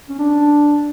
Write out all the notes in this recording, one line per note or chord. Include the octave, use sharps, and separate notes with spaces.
C#4
D4